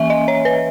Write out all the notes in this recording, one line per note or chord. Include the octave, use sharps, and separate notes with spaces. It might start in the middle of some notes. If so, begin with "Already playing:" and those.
Already playing: E3 A#3 C#4 E5 G#5
D#5
C#5
B4